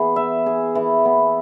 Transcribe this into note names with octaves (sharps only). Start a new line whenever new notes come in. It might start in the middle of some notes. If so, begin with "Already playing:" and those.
Already playing: E3 B3 G#4
E5
G#4
E3
B3